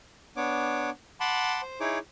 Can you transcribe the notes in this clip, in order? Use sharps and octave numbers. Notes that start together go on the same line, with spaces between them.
B3 D4 C#5 D6
F#5 A5 B5 C6 D6
C5
D#4 E4 G#4 C#5 D6